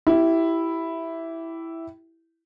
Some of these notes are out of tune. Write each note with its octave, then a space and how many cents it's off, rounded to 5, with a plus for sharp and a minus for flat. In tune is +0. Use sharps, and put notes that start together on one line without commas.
E4 +0 G4 -20